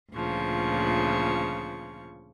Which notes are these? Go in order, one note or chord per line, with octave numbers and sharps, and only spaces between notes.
D2 A#2 C#3 F3 C#6